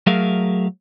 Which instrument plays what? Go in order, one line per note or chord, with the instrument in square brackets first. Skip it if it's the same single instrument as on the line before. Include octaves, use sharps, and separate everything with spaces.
[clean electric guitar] F#3 A3 G#4 A#4 E5 F5